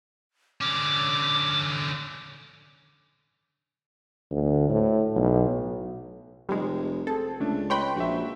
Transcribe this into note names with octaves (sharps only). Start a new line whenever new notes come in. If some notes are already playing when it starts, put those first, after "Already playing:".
D3 C#4 D6
D2
A2
B1
F1 G3 G#3
C4 G#4 A4
C#2 A3 D4
B4 C#5 D#5 G5 B5 C6
A#1 F#4 E5